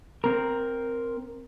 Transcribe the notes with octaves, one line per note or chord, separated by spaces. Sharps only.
C4 A#4